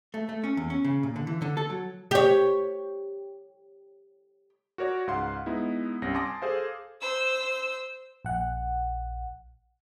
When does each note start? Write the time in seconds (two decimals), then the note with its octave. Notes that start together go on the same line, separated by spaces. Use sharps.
0.14 A3
0.29 A3
0.44 C#4
0.57 E2
0.70 C#4
0.84 C#3
1.03 A#2
1.16 D3
1.27 E3
1.42 D3
1.57 A4
1.70 F#3
2.11 G4 C#5
4.78 F#4 A#4 C#5 D5
5.07 C#2 G#2 F5 F#5 C6
5.46 G#3 B3 D#4 E4
6.02 C2 G2 C#4 A#6
6.14 G#5 A5 C6 D6 D#6 A#6
6.42 G#4 A4 C5 F5
7.01 C5 E6
8.25 A#1 F#5